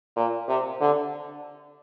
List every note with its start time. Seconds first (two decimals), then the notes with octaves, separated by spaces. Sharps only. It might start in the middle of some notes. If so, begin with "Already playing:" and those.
0.16 A#2
0.48 C3
0.80 D3